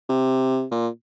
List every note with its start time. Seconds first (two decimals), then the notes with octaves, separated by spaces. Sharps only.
0.09 C3
0.71 A#2